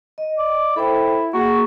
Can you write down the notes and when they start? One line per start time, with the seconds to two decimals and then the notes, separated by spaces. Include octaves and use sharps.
0.18 D#5
0.38 D5
0.76 E4 A4 C5 G5
1.33 A#3 F#4 G#4